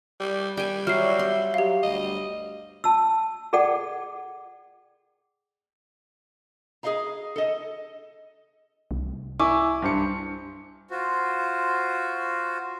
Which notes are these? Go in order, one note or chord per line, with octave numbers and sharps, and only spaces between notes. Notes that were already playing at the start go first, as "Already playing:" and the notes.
G3
G3 G5 G#5
F#3 D5 E5 F6 C7
C6
F#3 G4 F5
G1 D2 G3 D#5
A5 E6
G#4 A4 D5 F#5 G5
G#4 A#4 D#5 F5 A#5
A4 D#5
C2
E4 G#5 C#6 D6
G2 C5 C#7
F4 F#4 C5